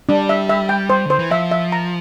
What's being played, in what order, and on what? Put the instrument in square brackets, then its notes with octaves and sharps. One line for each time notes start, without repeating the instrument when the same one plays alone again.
[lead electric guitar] G3 [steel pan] D4
[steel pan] E5
E5
G5
C5
[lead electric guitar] D3 [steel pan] C5
[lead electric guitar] E3
[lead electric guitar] F3 [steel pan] E5
[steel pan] E5
A#5